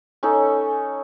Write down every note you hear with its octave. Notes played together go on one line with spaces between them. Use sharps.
C#4 D#4 A4